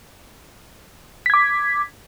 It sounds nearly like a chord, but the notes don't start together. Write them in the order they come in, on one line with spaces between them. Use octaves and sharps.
B6 G#6 D6